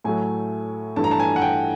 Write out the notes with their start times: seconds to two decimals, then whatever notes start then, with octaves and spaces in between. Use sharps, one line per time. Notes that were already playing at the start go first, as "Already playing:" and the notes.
0.04 A2 F#3 A3 G#5
0.96 G2 E3 A3 A5
1.04 A#5
1.11 A5
1.20 G#5
1.36 F#5
1.42 G5